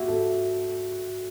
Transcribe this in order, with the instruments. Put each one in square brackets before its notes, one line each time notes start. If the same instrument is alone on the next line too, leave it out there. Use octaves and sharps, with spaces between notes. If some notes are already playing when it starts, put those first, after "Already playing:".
Already playing: [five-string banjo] E4 [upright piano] F#4 G4
[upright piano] A4